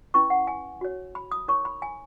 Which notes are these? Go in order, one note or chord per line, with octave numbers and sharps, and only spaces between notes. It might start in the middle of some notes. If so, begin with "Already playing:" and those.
C#4 E4 B4 C#6
F#5
G#5
F#4 C#5
B5
D#6
D#4 A#4 C#5 C#6
B5
G#5